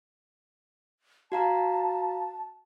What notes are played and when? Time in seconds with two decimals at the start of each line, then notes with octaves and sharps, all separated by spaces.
1.32 F#4 F5 A5 A#5